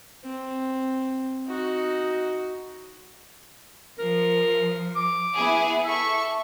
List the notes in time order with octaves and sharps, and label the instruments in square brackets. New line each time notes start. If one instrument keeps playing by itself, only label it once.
[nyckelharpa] C4
D#4 F#4
[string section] F3 [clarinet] A#4
[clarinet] D6
[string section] B3 E4 G#4
[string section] A4 C#6 [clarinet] E5